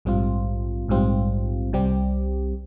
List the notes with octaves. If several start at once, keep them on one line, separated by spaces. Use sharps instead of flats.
A#1 G#2 G3 C4 F4
A#1 G#2 G3 C4 F4
C2 C3 G3 C4 G4